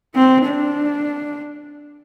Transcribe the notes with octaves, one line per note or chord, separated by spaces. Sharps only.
C4
D4